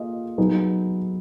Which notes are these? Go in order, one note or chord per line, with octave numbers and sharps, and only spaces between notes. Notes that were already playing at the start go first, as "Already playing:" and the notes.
Already playing: A#3 F4 G#4 D#5
F#3 B3 D#4 G#4